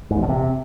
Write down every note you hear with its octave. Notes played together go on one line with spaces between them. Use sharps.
G#2
E2
B2
C3